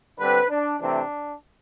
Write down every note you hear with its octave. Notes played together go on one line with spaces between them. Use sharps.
D3 G3 C4 B4
D4
C3 E3 A3 C4 D4